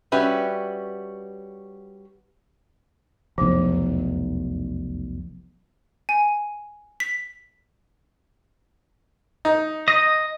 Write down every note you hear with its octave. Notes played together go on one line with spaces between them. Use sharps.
G3 C#4 F#4 B4 E5
F1 B1 E2 F3
G#5
B6
D#4
D#5